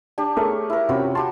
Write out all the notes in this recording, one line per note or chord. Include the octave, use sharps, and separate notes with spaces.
D4 G4
A3 G#4 A#4 C#5 C#6
E4 A#4
C3 C#4 F4 F#4 B5
F#4 G4 A5 C6